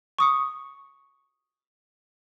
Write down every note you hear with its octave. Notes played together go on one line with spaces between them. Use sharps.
C#6 D#6 C#7